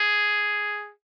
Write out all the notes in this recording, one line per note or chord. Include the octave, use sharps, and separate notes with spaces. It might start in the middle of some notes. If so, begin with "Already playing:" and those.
Already playing: G#4